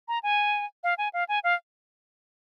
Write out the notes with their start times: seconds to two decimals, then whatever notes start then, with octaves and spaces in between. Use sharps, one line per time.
0.08 A#5
0.23 G#5
0.84 F5
0.98 G#5
1.13 F5
1.29 G#5
1.44 F5